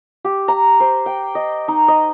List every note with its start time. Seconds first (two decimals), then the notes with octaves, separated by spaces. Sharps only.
0.25 G4
0.48 A#5
0.80 C5
1.06 G5
1.35 D#5
1.68 D#4
1.88 D#5